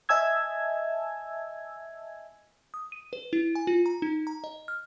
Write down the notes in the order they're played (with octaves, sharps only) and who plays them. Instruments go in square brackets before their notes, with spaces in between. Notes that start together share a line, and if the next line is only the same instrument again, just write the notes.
[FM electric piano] D#5 E5 G#5 A5 E6 G#6
[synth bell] D#6
D#7
B4
E4
G#5
F4
A#5
D#4
A#5
D#5
F6